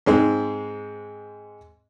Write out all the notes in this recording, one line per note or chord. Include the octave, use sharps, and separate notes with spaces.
G#2 G#3 C4